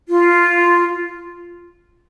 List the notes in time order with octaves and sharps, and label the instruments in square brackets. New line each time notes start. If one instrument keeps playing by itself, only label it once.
[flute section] F4